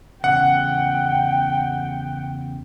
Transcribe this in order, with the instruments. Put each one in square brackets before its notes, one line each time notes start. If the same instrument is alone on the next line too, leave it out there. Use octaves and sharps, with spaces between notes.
[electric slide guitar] E2 C#3 [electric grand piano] F#5 [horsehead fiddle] G5